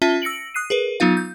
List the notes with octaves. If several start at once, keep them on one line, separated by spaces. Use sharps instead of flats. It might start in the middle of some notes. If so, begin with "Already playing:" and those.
C#4 F4 E5 A5 G7
E6 A#6 C#7 D7 F#7
D#6 F#6 C7 D#7
G#4 A#4 B4
F#3 B3 D#4 F4 F5
G6